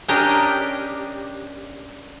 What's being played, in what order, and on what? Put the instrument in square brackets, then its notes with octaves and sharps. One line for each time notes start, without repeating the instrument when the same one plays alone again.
[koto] C#4 D4 G4 A#4 D#5